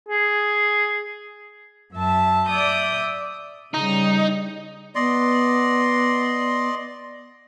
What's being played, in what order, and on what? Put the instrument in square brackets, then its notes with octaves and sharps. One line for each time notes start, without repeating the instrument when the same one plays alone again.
[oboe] G#4
[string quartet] F#2 E5 A5
D5 E5 D#6 G6
[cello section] C#3 G3 [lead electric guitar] D#4
[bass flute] B3 [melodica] D5 D#5 C6